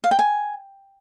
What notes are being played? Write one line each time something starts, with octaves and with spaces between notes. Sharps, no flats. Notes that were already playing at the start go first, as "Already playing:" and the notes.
F5
G5
G#5